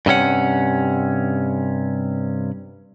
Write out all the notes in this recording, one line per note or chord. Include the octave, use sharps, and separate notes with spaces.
G2 C3 C#4 F#5